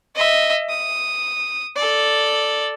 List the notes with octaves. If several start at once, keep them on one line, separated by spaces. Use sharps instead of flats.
D#5 E5
D#6
A4 D5